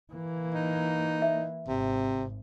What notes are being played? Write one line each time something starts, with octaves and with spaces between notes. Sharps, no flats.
E3 A#3
D#4
E5
G#1 C3